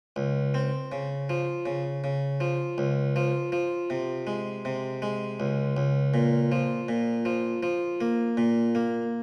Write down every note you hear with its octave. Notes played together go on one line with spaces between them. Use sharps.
C#2
C4
C#3
F3
C#3
C#3
F3
C#2
F3
F3
C3
G#3
C3
G#3
C#2
C#2
A#2
F3
A#2
F3
F3
A#3
A#2
A#3